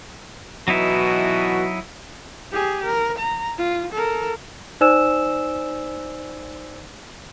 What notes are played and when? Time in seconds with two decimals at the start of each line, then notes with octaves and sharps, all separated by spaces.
0.68 B2 E3 F#3 D#4 E4 F#4
2.52 G4 G#4
2.85 A#4
3.18 A#5
3.58 F4
3.93 A4 A#4
4.81 D#4 C5 D5 G#5 E6 E7